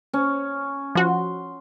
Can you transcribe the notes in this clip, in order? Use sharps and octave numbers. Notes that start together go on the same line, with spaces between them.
C#4
F3 F#4 C6